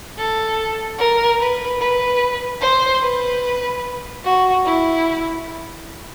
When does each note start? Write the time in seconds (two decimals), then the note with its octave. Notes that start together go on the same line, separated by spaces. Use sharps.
0.18 A4
0.99 A#4
1.40 B4
1.80 B4
2.61 C5
3.02 B4
4.24 F#4
4.65 E4